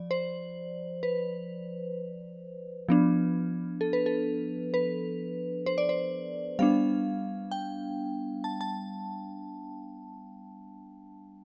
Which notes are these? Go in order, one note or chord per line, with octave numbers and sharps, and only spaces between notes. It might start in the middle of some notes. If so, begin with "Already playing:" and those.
Already playing: F3 D5
C5
B4
F3 B3 D4
A4
B4
A4
B4
C5
D5
C5
G3 B3 D4 F5
G5
A5
A5